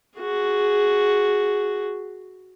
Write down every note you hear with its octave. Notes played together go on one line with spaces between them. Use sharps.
F#4 G#4